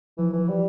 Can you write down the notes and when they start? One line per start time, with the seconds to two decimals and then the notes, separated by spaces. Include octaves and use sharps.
0.18 E3 F3
0.34 E3
0.39 F3
0.49 G3